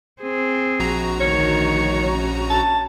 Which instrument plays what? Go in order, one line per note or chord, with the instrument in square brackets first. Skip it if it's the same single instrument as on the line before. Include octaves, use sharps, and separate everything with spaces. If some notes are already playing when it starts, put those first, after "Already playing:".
[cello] C4 G#4
[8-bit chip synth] A#1 F#4 A#5
[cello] D2 D#3 [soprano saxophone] C#5
[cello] C#4
[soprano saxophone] A5